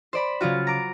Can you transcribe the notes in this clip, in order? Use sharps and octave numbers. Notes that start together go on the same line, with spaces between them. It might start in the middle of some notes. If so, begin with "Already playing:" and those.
C5 D5 B5
C#3 F#3 F4 F#4
A#5 D6